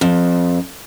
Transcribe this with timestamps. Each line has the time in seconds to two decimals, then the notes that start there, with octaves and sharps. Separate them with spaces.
0.01 F2